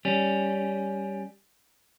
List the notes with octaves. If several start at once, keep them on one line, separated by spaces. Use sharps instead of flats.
G3 C#4